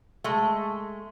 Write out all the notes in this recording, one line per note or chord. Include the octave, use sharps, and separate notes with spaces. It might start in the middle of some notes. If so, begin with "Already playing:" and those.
G#3 A3